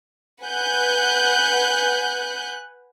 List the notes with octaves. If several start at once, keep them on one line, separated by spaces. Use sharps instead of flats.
B4 F#5 G#5 F#6 G6